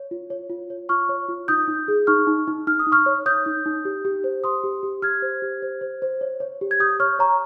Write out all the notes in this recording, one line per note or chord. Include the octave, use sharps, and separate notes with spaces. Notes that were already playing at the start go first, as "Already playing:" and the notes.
Already playing: C#5
F4
C#5
F4
C#5
F4 C#6 F6
C#5
F4
D#4 D#6 G6
D#4
G#4
D#4 C#6 F6
D#4
D#4
D#4 F6
D#6
D#4
C#6 F6
C#5
C#5 D#6 G6
D#4
D#4
G4
G4
C5
G4 C6 D#6
G4
G4
G4 F6 G#6
C5
G4
C5
C5
C5
C#5
C#5
G4
G#6
G4 D#6 G6
C#5 C#6 F6
C#5 A#5 C#6